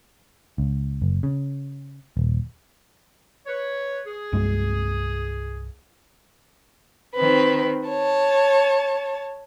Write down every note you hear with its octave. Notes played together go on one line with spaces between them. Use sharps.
C#2
F#1
C#3
D#1
B4 C#5
G#4
C2 G2 G#3
D#3 C4 B4
C#5 A5